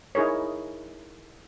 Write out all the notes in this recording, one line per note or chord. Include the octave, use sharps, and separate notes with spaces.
D#4 E4 G#4 A#4 C#5